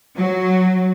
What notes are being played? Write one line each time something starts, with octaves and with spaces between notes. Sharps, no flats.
F#3